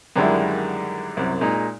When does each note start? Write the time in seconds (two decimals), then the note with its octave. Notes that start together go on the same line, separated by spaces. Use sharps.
0.16 F#2 D3 D#3 G3 G#3 E4
1.17 C2 F#2
1.41 A#2 G#3 D#4